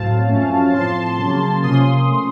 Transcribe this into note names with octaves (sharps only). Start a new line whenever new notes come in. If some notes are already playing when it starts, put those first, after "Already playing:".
Already playing: A2 F#3 C4 F5 A5
F#2 F3 A3 C#4
A2 F3 C4 A5 C6
C#3 F#3 A#3
C3 F3 A#3 C#4 C6 D#6
F3 A3 C#4